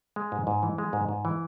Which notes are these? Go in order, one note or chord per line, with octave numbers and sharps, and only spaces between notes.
G#3
G#2
G#2
E3
G#3
G#2
G#2
E3